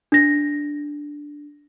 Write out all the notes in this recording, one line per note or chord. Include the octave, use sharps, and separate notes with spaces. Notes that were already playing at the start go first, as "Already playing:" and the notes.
D4 A#6